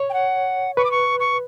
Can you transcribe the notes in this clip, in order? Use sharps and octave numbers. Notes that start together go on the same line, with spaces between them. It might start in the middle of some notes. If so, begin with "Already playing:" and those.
Already playing: C#5
G5
F#5
B4 C#6
D6
C#6
C#6